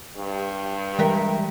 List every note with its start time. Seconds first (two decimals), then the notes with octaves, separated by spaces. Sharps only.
0.17 G2
0.99 E3 G3 G#3 G4 A#4 E5